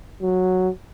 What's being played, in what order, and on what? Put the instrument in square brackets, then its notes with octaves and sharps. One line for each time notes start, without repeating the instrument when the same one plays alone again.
[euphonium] F#3